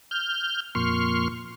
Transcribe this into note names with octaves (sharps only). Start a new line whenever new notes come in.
F6 G6
F2 A#2 C6 C#6 F6